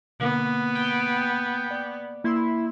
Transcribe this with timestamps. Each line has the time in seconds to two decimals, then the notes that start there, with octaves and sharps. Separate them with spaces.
0.20 B2 D3 A#3 B3
0.75 G5
1.71 D5
2.24 A#3 E4 C6